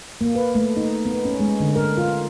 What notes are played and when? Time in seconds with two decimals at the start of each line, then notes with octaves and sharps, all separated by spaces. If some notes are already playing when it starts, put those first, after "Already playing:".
0.21 A#3
0.35 B4
0.55 A3
0.77 D#4
1.06 B3
1.25 C#4
1.40 G#3
1.60 D3
1.76 A#4
1.97 F4